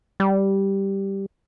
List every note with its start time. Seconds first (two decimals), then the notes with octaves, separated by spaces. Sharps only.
0.20 G3